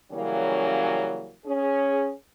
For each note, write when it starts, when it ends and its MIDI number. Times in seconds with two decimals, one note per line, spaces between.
0.12 1.32 49
0.12 1.32 52
0.12 1.32 54
0.12 1.32 55
0.12 1.32 58
0.12 1.32 61
1.46 2.12 61
1.46 2.12 68